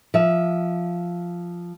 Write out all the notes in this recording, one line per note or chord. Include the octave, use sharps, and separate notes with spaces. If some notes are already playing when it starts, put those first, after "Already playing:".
F3 E5